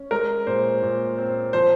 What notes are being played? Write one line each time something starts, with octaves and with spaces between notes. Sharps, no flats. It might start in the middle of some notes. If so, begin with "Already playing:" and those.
Already playing: C#4
G#3 A#4
A#2 C5
A#2
C4
F3 C5